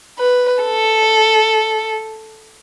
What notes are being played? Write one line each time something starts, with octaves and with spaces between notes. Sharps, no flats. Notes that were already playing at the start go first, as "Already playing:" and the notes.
B4
A4